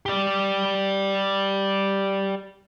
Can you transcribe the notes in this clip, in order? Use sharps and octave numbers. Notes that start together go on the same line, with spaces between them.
G4 D5